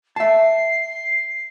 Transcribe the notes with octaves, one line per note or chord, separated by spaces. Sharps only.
E5 A5 C7